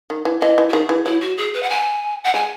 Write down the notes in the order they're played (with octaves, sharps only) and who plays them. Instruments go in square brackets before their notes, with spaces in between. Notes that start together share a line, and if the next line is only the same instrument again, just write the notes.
[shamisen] D#3
E3
[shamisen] E3 [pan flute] D#5
[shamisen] E3
[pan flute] F#4
[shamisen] D#3 [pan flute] G#4
[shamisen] E3
[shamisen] F#3 [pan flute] E4
[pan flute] F#4
G#4
B4
F#5
G#5
F#5
[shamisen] G#3 [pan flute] G#5